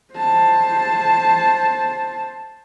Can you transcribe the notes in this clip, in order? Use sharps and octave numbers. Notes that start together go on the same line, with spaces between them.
C5 A5